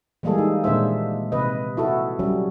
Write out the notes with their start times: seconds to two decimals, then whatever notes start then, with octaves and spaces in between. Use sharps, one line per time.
0.23 E3 G3 G#3 A#3 G#4 A4
0.38 D#4
0.64 A#2 D#3 G#3 D4 C5 E5
1.32 C3 B4 D#5
1.77 E4 F#4 A4
2.19 F#3 G3 C#4